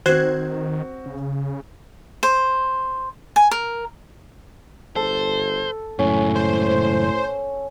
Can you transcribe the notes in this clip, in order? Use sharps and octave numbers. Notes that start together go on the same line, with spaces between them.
D#3 C4 F#4 C5 F#6 G#6
C#3
C5
G#5
A#4
G1 A4 C5
C#2 F#2 A2 C#4
C5